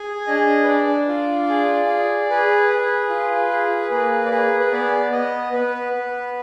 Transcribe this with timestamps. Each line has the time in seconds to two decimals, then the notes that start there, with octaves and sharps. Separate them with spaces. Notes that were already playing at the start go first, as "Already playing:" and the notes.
Already playing: G#4 G#5
0.27 D4 D#5
0.63 B4
0.68 D4 D5
1.09 F4
1.49 G#4
1.89 G#4
2.30 G#4 B4
2.70 G#4
3.10 F4
3.51 G#4
3.91 A#3 B4
4.26 D5
4.31 G#4 B4
4.60 B4
4.72 B3 D5
5.11 B3 D#5
5.53 B3 B4
5.93 B3